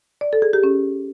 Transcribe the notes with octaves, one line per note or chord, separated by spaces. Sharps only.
D5
A4
G#4
G4
C#4